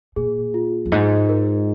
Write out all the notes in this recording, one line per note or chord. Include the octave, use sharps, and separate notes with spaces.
A#2 G#4
F4
F2
G#2 D#5
A#4